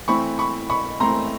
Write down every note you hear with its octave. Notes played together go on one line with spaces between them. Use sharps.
E3 A3 C4 B5 C#6
B5 C#6
B5 C#6
E3 A3 C4 A#5 C6